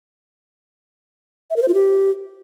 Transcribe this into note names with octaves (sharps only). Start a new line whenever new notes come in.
E5
A#4
C5
F4
G4